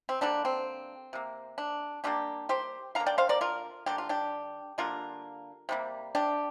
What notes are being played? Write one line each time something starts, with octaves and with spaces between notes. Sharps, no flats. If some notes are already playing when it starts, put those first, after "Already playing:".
C4
D3 G3 A#3 D4
C4
C3 A#3
D4
D3 G3 A#3 D4 G4
G4 C5
D3 A#3 F5 A#5
D5 G5
C5 F5
A#4 D5
F4 A#4
D3 G3 A#3 G4
F4
D4 G4
D3 G3 A#3 F4 A#4
C3 G3 A#3
D4 G4